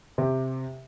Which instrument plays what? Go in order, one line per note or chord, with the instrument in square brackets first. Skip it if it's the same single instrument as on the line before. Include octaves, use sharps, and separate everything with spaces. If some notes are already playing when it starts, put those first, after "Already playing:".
[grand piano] C3 G4